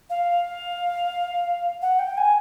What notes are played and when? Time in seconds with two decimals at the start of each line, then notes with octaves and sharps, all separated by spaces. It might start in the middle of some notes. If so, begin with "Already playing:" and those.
0.10 F5
1.82 F#5
1.99 G5
2.17 G#5